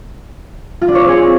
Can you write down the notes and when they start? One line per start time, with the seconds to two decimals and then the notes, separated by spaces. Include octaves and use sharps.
0.82 F4
0.88 D4
0.95 C#5
1.02 C4
1.08 G#4